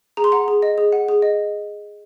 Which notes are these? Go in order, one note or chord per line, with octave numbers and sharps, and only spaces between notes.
G#4 A#5
C6
F#5 A#5
G#4
D#5
G#4
F#5
G#4
D#5